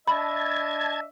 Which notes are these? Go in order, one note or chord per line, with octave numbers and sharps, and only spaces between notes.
D4 D#5 E5 A5 B5 G#6